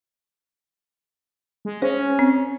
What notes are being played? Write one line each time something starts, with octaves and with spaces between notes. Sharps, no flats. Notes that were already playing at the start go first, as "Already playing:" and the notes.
G#3
C#4 C5
C4